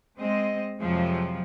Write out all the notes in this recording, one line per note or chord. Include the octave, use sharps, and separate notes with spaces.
G#3 C4 D#5
F2 C3 F3 F#3 G#3